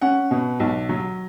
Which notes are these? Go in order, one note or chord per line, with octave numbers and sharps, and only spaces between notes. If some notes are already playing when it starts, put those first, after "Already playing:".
C#4 F#5
B2
B1
F#3